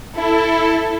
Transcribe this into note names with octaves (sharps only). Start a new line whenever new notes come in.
E4 A4